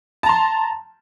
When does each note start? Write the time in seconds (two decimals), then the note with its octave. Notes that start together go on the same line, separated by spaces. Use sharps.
0.23 A5
0.26 A#5
0.29 C6